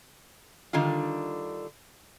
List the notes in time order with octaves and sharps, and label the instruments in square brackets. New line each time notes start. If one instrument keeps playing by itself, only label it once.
[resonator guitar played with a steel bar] D3 D#3 G3 F4